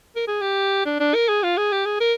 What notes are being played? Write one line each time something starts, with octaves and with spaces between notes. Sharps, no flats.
A#4
G#4
G4
D4
D4
A#4
G#4
F4
G#4
G4
G#4
A#4